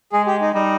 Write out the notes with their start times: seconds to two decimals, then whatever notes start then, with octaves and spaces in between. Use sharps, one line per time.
0.12 G#3 G#4
0.26 G4
0.40 D#4
0.54 G3 D#4